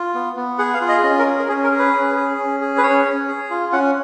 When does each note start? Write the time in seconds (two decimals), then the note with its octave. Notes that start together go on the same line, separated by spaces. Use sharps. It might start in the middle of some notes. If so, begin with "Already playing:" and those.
Already playing: F4
0.14 B3
0.36 B3
0.58 G#4 F#5
0.74 F5
0.81 F4
0.89 D#5
1.03 C#4 D#5
1.19 A#4
1.26 G#4
1.40 A#4
1.48 C#4 G#4
1.64 A#4
1.71 G#4
1.79 B4
1.93 C#4
2.16 G#4
2.38 C#4
2.61 G#4
2.78 B4
2.83 C#4 C#5
3.05 C#4
3.28 G#4
3.50 F4
3.73 C#4 F#5